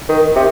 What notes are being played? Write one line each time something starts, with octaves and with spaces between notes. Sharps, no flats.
D#3
C3